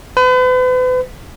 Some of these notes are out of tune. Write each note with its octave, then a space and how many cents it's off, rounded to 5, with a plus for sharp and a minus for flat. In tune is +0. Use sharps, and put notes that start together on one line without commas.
B4 +40